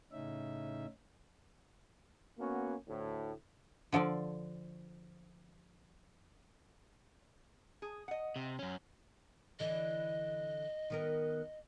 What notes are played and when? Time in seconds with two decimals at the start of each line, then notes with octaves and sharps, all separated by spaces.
0.12 A2 C#3 C#4 D#4 E5
2.39 A#3 B3 C#4 F#4
2.87 D2 A2
3.92 D3 F3 A4 D5
7.82 G#4
8.08 D#5 F#5
8.36 C3
8.59 F#2 C#4
9.60 D3 E3 D#5
10.90 D#3 B3 A#4